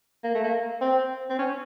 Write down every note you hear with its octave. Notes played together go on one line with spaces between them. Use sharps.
A#3
A3
A#3
C4
C4
C#4